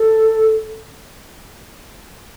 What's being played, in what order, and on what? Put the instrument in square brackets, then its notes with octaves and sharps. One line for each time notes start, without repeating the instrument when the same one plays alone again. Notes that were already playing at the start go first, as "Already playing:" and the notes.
Already playing: [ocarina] A4